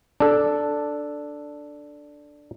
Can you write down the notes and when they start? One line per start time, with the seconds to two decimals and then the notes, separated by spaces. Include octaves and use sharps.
0.20 D4 A4